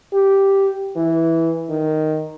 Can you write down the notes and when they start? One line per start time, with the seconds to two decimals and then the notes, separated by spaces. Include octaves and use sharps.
0.13 G4
0.96 E3
1.70 D#3